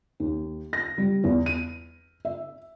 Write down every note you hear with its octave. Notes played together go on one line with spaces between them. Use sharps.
D#2
A#6
G3
E2
D#7
E5